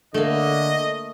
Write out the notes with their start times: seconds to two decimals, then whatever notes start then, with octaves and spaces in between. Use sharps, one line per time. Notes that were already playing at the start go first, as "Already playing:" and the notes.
0.14 D3 A3 A#3 D#5